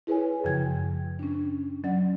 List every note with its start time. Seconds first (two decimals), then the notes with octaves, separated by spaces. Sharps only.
0.07 E4 G#4 B4 C#5 G#5
0.44 F#2 C#3 F3 G5 G#6
1.19 C#4 D4
1.84 F#3 C#4 D5 F#5